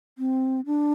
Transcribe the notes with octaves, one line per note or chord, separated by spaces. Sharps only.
C4
D4